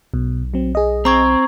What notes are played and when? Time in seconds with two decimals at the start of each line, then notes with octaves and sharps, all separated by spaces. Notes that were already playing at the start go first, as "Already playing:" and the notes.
0.14 B1 B2
0.54 F#3 C4
0.75 G#4 D#5
1.05 C4 A#5 C#6 G#6